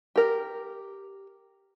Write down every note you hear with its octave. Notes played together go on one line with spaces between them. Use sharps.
G4 A#4